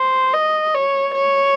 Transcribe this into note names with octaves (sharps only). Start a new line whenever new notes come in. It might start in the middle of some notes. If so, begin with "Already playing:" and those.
Already playing: C5
D#5
C#5
C#5